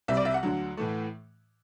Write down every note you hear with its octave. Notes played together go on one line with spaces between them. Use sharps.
C2 C3 G3 E5
D5
E5
F#5
D2 D3 F#3
A2 E3 A3